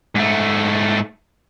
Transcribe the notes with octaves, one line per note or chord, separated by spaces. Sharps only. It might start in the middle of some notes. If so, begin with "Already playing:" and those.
G#2 A3